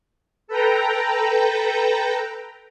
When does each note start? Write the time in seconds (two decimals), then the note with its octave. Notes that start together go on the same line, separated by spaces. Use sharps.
0.48 A4 B4 G5 A#5